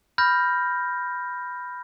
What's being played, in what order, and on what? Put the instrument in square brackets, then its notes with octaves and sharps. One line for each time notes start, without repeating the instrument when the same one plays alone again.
[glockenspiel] B5 F6 G6 A#6